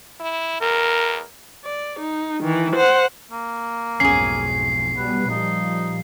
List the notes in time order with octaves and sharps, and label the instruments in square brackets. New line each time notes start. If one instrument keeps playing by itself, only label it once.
[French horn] E4
[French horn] E2 [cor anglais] A#4
[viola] D5
D#4
D#3 E3
C5 F#5
[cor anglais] A#3
[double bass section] B1 F2 G#2 [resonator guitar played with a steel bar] C#4 G#4 [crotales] C7
[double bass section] B2 G3 B3 [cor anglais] B4
[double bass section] A#2 F3 G3 [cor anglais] D#4